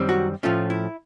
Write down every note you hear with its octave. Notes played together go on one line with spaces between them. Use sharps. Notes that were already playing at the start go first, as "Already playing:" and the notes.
Already playing: F#2 D#3 G3 C4
F#4
A2 F3 A3 C#4 F4
E4